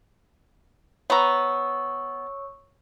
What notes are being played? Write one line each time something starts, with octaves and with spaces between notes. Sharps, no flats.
B3 C#5 A#5 C#6 E6